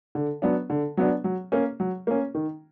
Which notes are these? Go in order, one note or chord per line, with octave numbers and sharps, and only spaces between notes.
D3
F#3 B3 D4
D3
F#3 B3 D4
F#3
A#3 C#4
F#3
A#3 C#4
D#3